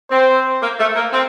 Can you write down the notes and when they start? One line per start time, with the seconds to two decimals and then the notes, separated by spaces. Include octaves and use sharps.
0.11 C4 C5
0.62 A#3
0.79 A3
0.95 A#3
1.13 C4